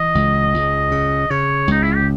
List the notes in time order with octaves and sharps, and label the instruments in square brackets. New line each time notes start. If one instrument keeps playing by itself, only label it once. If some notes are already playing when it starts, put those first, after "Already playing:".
Already playing: [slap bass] E3 [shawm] D#5
[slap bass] C#2
C#2
C#3
[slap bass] C#3 [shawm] C#5
[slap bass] C#2 [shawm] D#4
[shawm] E4
G4